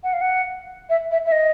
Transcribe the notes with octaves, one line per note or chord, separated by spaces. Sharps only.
F#5
F5
F#5
E5
E5
E5
D#5